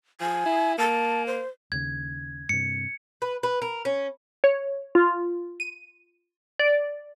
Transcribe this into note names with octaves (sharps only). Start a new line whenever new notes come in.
F3 G#5
E4
A#3 A5
C5
D#2 C#3 G#6
G2 C3 C#7
B4
B4
A#4
C#4
C#5
F4
D#7
D5